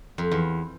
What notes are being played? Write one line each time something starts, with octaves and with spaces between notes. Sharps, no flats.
F2
E2